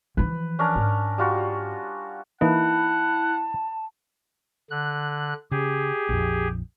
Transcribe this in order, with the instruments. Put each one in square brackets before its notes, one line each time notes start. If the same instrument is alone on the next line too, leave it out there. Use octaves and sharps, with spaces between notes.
[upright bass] E3 F3 [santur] B4
[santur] C#4 D4 A#4
[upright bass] G#2
[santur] G3 F4 F#4
[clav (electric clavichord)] E3 A#3 D#4 [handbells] E4 [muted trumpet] F#5 [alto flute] A5
[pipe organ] D3 F#6
[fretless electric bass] C#3 [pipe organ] G4 G#4
[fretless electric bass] A#1 F2